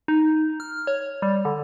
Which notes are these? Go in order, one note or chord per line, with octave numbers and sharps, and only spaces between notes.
D#4
F6
C#5
G3
D3